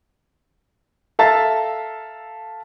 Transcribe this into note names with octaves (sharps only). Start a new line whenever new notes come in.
A4 E5 F5 A5 A#5 A6